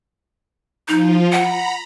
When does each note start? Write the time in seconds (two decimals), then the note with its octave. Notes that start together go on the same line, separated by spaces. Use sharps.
0.88 F3 D#4 F4
1.33 F#5 A#5 B5